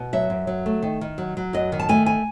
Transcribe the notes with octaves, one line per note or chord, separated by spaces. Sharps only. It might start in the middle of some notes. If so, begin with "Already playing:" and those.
Already playing: B2
F#3 E5
F#2
F#3
A3
D#3
D#3
F#3
F#3
F#2 D#5
D#3
A5
A3 G#5
G#5